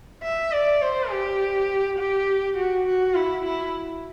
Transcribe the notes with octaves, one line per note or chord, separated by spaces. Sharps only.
E5
D5
C5
G4
G4
F#4
F#4
E4
E4